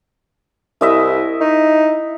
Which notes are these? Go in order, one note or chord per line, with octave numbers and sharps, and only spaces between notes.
C2 E4 D#5 E5
D#4